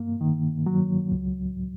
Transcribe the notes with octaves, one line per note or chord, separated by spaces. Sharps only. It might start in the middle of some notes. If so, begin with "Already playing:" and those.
Already playing: G2 A#3
D#3
F#3
C#2